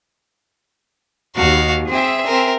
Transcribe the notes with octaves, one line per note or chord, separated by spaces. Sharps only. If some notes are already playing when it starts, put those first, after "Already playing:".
D#2 F#4 F5
C4 G#4 E5
C4 A#4